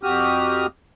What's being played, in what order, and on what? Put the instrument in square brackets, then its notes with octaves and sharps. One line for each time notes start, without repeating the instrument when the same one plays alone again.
[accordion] F2 F#4 G4 D#6 F6